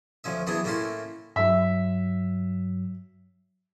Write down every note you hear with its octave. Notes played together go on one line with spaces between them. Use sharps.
D2 F3 C#4 E5
E3 F#3 B3 D4 G#4
A2 A3 A#3 C#4 E4 C6
G2 F#3 E5